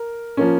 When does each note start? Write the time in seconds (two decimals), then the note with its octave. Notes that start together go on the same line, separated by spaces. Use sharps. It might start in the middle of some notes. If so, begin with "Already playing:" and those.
Already playing: A#4
0.37 F3 A#3 C#4